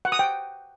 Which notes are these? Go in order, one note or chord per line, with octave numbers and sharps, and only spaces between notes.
F#5
D#6
G5